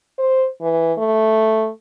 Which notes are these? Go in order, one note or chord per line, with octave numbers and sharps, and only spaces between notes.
C5
E3
A3